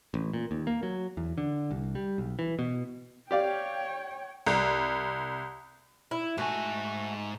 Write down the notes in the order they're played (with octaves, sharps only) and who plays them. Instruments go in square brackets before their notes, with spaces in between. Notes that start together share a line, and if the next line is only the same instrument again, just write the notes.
[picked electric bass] A1
A#2
D#2
A#3
F#3
E2
D3
C2
G3
B1
E3
B2
[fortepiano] G4 D5 F5 [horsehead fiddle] C#5 G5
[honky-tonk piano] C2
[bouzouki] E4
[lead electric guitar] G#2 G#5 [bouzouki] A3 F#4